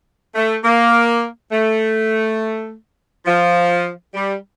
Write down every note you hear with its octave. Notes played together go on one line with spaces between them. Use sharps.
A3
A#3
A3
F3
G3